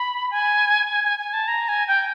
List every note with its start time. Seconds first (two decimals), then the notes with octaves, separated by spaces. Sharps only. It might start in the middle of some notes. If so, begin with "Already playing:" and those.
Already playing: B5
0.31 G#5
0.90 G#5
1.04 G#5
1.19 G#5
1.33 A5
1.48 A#5
1.69 G#5
1.88 G5